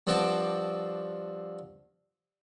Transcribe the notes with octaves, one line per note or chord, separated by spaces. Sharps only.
G2 F3 C4 F#4 A5 D6